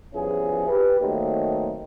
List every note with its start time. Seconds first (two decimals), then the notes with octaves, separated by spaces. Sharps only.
0.14 G2 F3 B3 C#4 E4 G#4
0.68 G4 B4
1.00 D#3 F#3 A3 A#3 C4 D#4